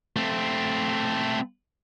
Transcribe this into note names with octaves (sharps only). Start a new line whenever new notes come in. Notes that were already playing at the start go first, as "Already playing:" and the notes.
A3 C4